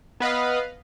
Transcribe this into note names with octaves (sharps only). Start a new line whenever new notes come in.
B3 B4 D#5 F5